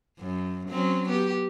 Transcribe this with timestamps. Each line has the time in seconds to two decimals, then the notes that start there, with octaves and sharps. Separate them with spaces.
0.19 F#2
0.68 F#3 C4 C#4
1.09 B3 G4